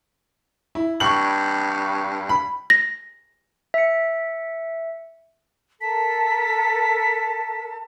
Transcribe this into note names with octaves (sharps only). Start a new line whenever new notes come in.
E4
G2 C#6 F#7
B5
A#6
E5 C#7
A4 A#4 A5 B6